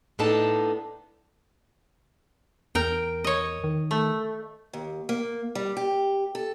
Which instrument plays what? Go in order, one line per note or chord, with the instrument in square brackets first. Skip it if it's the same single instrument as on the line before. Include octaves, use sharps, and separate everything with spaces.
[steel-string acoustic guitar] A2 B3 D4 D#4 A4 A5
[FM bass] E2 [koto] A#4 G5
[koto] C#5 D#5
[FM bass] D#3
[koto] A3
[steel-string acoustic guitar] D#2
A#3
G3
G4
A4